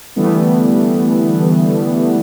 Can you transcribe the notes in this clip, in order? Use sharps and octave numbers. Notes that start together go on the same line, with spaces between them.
D3 E3 G3 A3 B3